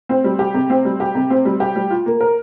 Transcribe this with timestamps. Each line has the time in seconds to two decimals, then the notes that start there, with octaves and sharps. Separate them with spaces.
0.09 C4
0.24 G3
0.39 G4
0.54 C3
0.70 C4
0.85 G3
1.00 G4
1.15 C3
1.30 C4
1.45 G3
1.60 G4
1.76 G3
1.90 F4
2.06 A#3
2.21 A#4